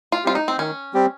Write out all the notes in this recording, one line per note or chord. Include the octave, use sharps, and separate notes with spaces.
F4
G3 C4 F4 G4
D#4
C4
D#3 C#4
G3 C4 G4